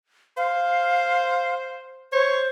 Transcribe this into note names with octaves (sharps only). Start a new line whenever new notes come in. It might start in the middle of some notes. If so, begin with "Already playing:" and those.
C5 F5
C5 C#5